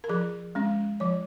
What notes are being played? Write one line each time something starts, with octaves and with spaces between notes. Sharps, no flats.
A#4
F3 G#4
G#3 C#4
F3 C#5